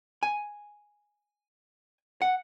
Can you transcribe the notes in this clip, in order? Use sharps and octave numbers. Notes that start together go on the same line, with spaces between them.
G#5
F#5